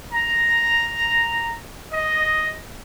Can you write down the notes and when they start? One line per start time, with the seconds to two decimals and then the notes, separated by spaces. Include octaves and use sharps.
0.12 A#5
1.90 D#5